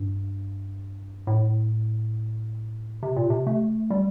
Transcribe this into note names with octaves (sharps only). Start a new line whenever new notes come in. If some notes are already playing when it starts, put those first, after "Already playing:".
Already playing: G2
A2
C3
A#2
C3
A3
G3